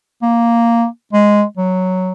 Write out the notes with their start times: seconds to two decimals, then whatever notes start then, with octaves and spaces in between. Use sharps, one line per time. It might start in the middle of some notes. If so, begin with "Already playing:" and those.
0.22 A#3
1.13 G#3
1.57 F#3